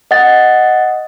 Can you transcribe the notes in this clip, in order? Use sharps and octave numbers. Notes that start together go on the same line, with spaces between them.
D#5 F#5 A6